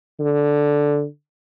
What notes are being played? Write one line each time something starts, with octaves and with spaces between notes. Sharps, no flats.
D3